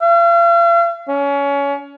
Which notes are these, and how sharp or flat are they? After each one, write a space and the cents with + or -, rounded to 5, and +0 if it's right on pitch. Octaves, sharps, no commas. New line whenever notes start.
F5 -45
C#4 +25